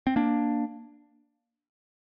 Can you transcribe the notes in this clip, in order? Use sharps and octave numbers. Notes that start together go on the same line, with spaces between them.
C4
A#3 D4